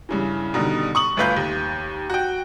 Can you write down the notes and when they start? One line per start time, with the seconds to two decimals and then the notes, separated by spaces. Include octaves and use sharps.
0.09 G2 C#3 E3
0.54 B2 D3 D#3 G3
0.95 C#6 D#6 F#7
1.17 G1 D2 F4 B4 F5 G6
1.37 D#2
2.10 F#4 G5